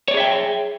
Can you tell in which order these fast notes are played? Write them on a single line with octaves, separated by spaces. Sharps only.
C#5 D5 G#4 E5 G5